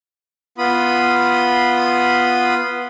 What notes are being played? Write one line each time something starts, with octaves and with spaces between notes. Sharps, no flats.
B3 F4 B5 D#6